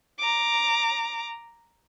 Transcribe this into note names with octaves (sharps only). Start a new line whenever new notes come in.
A#5 D6